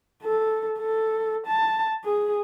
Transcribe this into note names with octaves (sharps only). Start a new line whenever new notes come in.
A4
A4
A5
G#4